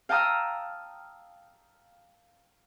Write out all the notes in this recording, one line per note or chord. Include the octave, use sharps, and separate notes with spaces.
F5 G5 A5 A#5 D#6 E6